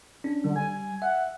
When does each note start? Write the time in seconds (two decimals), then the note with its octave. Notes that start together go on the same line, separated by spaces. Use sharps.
0.24 C#4 D4
0.44 D3 G3
0.56 G#5
1.02 E5 F#5